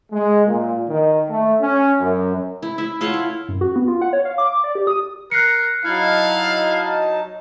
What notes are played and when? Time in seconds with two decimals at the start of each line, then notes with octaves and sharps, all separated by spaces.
0.11 G#3
0.45 A#2
0.88 D#3
1.28 A3
1.61 C#4
2.00 F#2
2.62 E4
2.78 E4 E5
3.01 F4 A4 C#5 F#5
3.14 E4
3.48 F#2
3.61 F#4
3.76 B3
3.88 F4
4.02 F#5
4.13 C#5
4.25 F5
4.38 D6
4.64 D5
4.75 G4
4.87 D#6
5.31 A#4 F#6 C7 C#7
5.85 F#3 D#4 E4 F5 A5